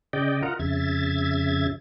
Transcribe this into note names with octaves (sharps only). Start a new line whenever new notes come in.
C#3 D5 D#5 G5
F4 A#4 D#5 F#5 A#5
F2 C#3 E5 G#6 A6